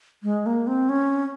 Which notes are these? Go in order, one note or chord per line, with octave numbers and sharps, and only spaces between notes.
G#3
A#3
C4
C#4